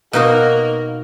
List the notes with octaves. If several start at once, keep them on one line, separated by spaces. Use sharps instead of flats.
B2 A#3 D#4 F#4 A#4